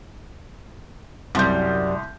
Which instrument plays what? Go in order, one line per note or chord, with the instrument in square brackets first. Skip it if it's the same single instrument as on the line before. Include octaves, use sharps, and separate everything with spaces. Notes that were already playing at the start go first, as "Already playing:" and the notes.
[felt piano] C2 C6 G6 [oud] F#2 G3